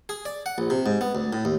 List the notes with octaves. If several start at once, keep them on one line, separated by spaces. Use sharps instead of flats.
G#4
D5
F#5
A#1
C3
G#2
B3
D2
A2
D#2